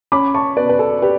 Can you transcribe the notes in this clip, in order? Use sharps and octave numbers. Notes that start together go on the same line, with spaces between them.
C#4 B5 D6
A5 C#6
B2 B4 D5
B4
A4
G4 B4